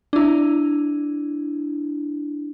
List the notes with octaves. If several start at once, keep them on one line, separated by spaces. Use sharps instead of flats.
D4 E4